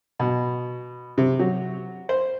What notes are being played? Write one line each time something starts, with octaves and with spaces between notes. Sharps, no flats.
B2
C3
F#3
C5